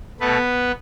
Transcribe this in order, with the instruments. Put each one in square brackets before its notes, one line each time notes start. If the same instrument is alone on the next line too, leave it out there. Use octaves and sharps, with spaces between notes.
[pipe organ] B2 A3 B3 B4